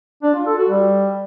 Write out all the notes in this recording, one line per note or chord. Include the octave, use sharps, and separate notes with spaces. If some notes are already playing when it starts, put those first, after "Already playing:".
D4
F4
A4
F#4
G3